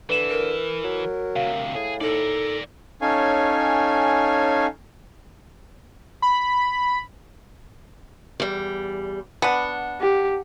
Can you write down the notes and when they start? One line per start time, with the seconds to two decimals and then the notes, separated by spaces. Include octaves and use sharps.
0.09 D3 E3 B4 E7
0.30 A#4
0.84 F#3
1.36 D2 C3 F5
1.74 A2 G#4
2.01 D#4 A4 A#4 D5
3.01 C#4 D#4 A4 C#5 F5 G#5
6.22 B5
8.40 E2 G3
9.42 B3 D4 F#5
10.00 G4